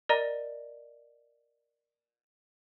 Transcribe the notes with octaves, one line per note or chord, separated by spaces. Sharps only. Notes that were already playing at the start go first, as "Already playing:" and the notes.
A#4 D5 D#5 A#5 A#6 D#7